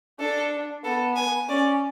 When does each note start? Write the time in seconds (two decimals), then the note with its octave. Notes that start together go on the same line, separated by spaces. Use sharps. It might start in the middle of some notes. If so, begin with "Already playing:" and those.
0.20 D4 A4
0.84 B3 A4
1.16 G#5
1.49 C#4 D5